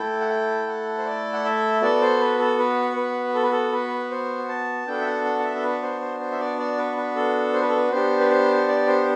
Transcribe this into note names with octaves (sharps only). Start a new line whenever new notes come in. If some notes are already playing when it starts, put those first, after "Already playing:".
Already playing: A3 E4 A4 G5
F#5
G5
F#5
C5
D5
F#5
E5
B3 F#4 A4 D5
C5
B4
A4
B4
B4
A4
B4
A4
B4
C5
A5
B3 D4 F#4 A4 G5
E5
F#5
F#5
F#5
E5
A4
B4
C5
C5
C5
E5
D5
D5
B4
B4
A4
C5
B4
A4
B4
B3 D4 G4 C5
B4
C5
D5
C5